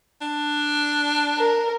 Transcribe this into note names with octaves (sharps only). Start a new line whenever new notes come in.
D4
A#4